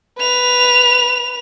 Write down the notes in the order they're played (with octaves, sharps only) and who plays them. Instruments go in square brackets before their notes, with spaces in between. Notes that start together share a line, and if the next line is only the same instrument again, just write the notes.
[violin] B4 F7